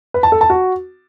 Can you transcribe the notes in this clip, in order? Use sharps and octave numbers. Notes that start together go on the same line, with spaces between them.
B4
A5
A4
A5
F#4